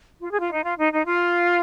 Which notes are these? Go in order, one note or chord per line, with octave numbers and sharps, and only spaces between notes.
F4
G#4
F4
D#4
F4
D#4
D#4
F4